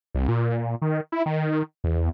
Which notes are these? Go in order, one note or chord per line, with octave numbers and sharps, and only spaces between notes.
C2
A#2
D#3
E4
D#3
E2